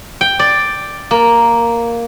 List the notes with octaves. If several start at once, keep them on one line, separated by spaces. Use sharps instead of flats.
G5
D5
A#3